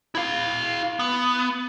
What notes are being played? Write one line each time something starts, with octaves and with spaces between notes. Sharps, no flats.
E4 F5
B3